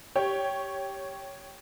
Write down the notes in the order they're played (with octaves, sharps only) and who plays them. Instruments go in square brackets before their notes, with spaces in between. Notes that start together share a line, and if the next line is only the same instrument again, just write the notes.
[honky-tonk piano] G4 C#5